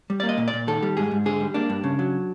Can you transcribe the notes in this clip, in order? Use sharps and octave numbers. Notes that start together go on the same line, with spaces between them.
G3
D5
A#3
D#5
A#2
D5
A#2
D#3 A4
G3
G#2 G#4
G#2
D3 G#4
G3
A#3 D4
G2
C#3
F#3